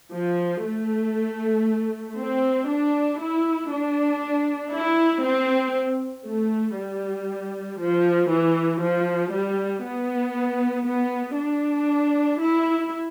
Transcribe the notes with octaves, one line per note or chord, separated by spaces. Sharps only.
F3
A3
C4
D4
E4
D4
E4
C4
A3
G3
F3
E3
F3
G3
B3
B3
D4
E4